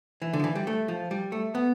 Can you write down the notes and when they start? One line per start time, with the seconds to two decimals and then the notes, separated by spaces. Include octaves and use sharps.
0.22 E3
0.33 D3
0.39 F3
0.44 E3
0.55 G3
0.67 A3
0.88 F3
1.11 G3
1.32 A3
1.55 B3